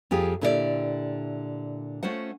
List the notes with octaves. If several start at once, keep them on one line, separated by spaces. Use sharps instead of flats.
F2 F4 G4 G#4
A#2 D3 E4 G4 A4 D5
A3 C#4 F4 C5 F#5